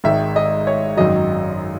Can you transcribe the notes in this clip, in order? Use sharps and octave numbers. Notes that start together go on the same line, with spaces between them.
G#1 G#2 D#3 E5
D#5
C#5
G#1 F#2 D#3 F#3 D#5